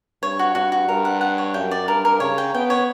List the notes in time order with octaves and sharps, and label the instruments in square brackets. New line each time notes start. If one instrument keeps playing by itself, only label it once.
[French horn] G2 [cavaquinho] C#5
[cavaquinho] F#4
[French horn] G2 [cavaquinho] F#4
[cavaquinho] F#4
[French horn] G2 [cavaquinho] A#4
[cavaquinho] F#5
F#5
C#5
[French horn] F#2 [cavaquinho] G5
[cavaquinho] D5
[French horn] G2 [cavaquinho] A#4
[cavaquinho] A#4
[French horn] C#3 [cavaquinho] C#5
[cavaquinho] G5
[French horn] B3 [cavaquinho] G5
[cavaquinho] C#5